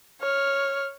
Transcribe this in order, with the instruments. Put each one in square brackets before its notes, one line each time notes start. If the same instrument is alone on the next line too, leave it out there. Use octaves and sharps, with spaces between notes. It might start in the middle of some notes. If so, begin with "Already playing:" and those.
[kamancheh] C#5 F6